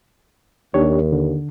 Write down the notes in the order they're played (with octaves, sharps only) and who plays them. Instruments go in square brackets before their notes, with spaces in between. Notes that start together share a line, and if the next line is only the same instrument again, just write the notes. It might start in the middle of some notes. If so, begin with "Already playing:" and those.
[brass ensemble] D#2 [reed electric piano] D4 G4 C#5
[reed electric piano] D3